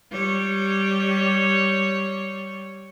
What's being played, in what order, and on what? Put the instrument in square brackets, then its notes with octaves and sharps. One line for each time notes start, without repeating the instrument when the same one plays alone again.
[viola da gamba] G3 C#5